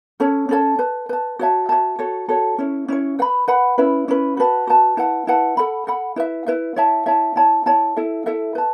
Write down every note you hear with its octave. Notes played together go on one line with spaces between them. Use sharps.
C#4 A4 C#5 A5
C#4 A4 C#5 A5
B4 A5
B4 A5
F#4 C#5 E5 A5
F#4 C#5 E5 A5
F#4 A4 C#5
F#4 A4 C#5
C#4 E4 C#5
C#4 E4 C#5
B4 F#5 B5
B4 F#5 B5
C#4 E4 B4
C#4 E4 B4
F#4 B4 A5
F#4 B4 A5
E4 B4 F#5 A5
E4 B4 F#5 A5
A4 F#5 B5
A4 F#5 B5
E4 B4 E5
E4 B4 E5
E4 C#5 E5 A5
E4 C#5 E5 A5
E4 C#5 A5
E4 C#5 A5
E4 A4 E5
E4 A4 E5
B4 A5